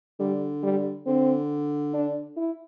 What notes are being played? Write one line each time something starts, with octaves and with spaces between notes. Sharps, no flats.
D3 G3
G3
D3 C4
D4
E4